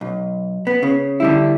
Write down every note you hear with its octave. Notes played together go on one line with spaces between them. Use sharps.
B1
B3
C#3
D3 G3 E4